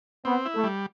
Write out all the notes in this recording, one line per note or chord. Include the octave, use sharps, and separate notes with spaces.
B3 C4
E4
A3
G3